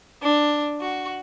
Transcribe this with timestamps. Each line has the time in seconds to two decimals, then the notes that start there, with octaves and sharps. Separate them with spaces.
0.22 D4
0.80 F#4